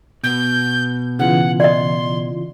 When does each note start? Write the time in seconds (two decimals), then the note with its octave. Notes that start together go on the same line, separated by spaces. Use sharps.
0.23 B2 B3 G6
1.19 C#3 E3 F4 F#5
1.60 D5 D#5 C6